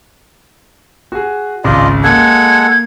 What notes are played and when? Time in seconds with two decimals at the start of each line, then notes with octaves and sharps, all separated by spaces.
1.12 F#4 G#4
1.64 G#1 C#2 F4 D5 D#5
2.04 G#3 A#3 A4 F#5 G#6